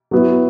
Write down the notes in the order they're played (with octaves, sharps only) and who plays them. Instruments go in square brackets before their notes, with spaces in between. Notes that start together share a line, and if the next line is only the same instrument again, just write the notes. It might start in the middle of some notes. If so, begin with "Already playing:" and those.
[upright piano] F#3 B3 E4